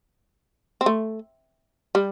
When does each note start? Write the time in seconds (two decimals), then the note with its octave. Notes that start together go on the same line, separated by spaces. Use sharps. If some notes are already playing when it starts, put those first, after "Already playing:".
0.81 C4
0.86 A3
1.95 G3